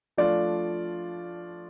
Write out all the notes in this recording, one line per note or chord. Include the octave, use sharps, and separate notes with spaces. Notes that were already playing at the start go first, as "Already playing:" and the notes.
F3 A3 D4 F4 D5